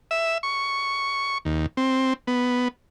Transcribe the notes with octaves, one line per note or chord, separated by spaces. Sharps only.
E5
C#6
D#2
C4
B3